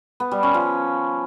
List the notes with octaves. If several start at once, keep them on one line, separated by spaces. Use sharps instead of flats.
B3
G3
C#4
F3